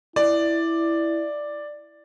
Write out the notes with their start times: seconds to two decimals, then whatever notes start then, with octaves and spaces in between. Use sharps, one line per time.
0.16 E4 D5